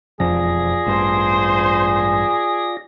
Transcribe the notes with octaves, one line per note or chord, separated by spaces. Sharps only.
E1 F2 F3 F4 G#4 D5 A#6
A1 G2 C5